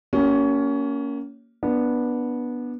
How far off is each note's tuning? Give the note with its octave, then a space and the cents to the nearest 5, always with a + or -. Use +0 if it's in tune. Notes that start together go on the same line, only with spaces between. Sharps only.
A#3 +0 C#4 +20 G4 -45
B3 -15 D4 +0